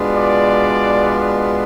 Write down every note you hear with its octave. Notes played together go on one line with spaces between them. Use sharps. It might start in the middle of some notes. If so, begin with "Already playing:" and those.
Already playing: B2 G#3 B3 D4 F4
D5